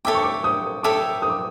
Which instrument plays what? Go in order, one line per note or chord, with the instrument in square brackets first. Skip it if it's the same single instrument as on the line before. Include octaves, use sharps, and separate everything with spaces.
[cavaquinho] A4 C#5 E5 G5 [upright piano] D6
[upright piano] C#6
D6
D#6
[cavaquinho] A4 C#5 E5 G5 [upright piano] D6
[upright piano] D#6
D6